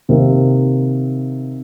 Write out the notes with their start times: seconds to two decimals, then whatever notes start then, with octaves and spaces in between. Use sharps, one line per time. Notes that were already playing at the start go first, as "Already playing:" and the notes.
0.09 C3 D#3 A#3